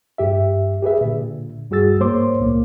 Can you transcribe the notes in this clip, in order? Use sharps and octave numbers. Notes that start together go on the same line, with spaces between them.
G2 G4 E5
G4 G#4 B4 E5
A#2 D3
G2 G3 F#4 G#4 E6 A6
G#2 A#3 C5 C#5 C6 D6
C#2 A#2 A#3